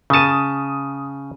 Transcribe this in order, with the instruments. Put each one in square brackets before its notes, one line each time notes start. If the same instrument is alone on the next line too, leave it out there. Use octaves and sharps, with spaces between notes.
[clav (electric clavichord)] C#3 A5 [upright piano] D#6 D#7